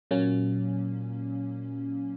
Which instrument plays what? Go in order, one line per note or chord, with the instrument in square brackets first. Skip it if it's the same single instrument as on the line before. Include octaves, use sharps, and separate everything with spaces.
[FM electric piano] A#2 F#3 A#3 C#4